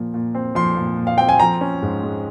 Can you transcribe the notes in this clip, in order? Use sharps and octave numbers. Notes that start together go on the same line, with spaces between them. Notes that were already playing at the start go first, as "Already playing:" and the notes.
Already playing: A#2 F3
A#2
C4
F3 C6
A#2
A#2
F5
C4 G5
G#5
F3 A#5
C#4
G#2
G#3